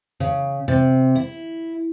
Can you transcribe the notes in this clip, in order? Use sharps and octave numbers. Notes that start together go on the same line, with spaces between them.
C#3
C3
E4